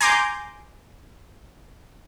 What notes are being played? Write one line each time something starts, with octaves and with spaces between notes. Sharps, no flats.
G#5 A#5 C6 D6 G6